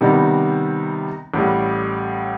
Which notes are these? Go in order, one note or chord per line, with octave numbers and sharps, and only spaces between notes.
C3 D#3 G3 B3 D#4
A1 A2 G3